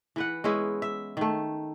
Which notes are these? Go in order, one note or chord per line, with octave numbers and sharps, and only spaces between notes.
E3 B4 F#5
G#3 B3 C#4 E4
E5
D#3 A3